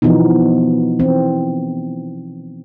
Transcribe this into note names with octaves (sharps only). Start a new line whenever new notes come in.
B2 E3 F3 B3 D#4
E3 C4